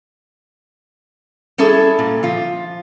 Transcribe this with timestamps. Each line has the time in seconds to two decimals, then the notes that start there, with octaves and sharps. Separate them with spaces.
1.58 G3 C#4 E4 G#4 A4
1.99 A#2
2.23 F3 F4